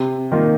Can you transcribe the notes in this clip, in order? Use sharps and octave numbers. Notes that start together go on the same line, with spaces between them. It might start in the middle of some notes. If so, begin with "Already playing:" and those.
Already playing: C3
D#3 A#3 F4